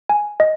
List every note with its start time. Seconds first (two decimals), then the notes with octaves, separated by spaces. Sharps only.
0.09 G#5
0.40 D#5